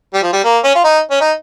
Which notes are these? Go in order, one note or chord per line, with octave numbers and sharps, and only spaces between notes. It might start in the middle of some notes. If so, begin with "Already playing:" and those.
G3
F3
G3
A#3
C#4
F4
D#4
C#4
D#4